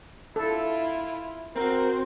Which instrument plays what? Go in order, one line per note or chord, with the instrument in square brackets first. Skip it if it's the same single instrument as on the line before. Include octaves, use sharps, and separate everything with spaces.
[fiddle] E4 F4 [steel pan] A4
[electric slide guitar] C4 [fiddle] F#4 C5 [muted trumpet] A#4